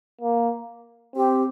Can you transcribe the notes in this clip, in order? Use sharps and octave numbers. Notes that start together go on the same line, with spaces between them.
A#3
C4 G4